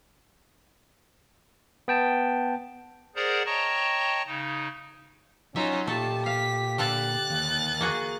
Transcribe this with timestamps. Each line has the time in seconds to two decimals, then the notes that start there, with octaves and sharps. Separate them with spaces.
1.88 B3 G5 A5
3.16 G#4 A#4 C5 D5 F#5 A#5
3.46 C#5 D#5 G5 A5 A#5 C#6
4.27 C#3 D#4
5.56 F#3 C#4 D#4 F4 E5
5.87 A#2 A3 G4 A4 A5
6.26 F5 B6
6.78 D3 A4 F5 F#6 A6
7.30 D#2
7.81 A#3 F#4 G#4